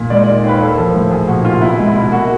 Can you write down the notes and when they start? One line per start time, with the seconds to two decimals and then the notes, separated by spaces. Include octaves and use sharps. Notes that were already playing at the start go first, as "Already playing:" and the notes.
Already playing: A#2
0.10 G#3 D5
0.23 D#3 D5
0.43 D#2 B4
0.60 A#3 A4
0.78 F3
0.94 A2
1.11 F3 G#4
1.28 A#2 F#4
1.45 C2 F4
1.62 B3 E4
1.79 G#3
1.87 E4
1.95 B2
2.12 A#3 F#4